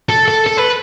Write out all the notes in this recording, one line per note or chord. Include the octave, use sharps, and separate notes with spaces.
A4
A4
A4
B4